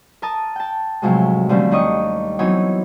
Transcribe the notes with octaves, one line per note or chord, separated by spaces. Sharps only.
A#4 A5 D#6
G5 A5
A2 C3 F3 F#3 G#3
D3 F3 G3 A3 C4 C#4
D#2 D4 D#5 C#6 D#6
E3 F#3 B3 C4 D#4 C#5